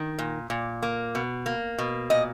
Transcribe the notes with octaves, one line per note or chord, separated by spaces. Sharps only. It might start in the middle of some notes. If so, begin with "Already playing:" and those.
Already playing: D#3
A#2
A#2
A#3
B2
A#3
B2
A#2 D#5